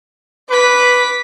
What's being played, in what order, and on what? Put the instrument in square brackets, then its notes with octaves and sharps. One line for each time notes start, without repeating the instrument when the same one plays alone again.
[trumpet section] B4 [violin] D6 B6